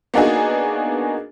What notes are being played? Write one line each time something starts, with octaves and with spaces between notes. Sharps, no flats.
A#3 B3 D4 D#4 F#4 G#4